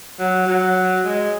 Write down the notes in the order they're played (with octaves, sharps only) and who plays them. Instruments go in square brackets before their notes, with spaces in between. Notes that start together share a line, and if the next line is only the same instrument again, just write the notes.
[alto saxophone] F#3
F#3
G#3